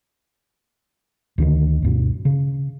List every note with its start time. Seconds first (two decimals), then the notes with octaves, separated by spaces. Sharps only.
1.38 D2 D3 D#3
1.82 D2 G2 B2
2.25 C#3